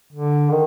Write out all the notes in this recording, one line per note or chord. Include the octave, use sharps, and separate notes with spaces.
D3
D#3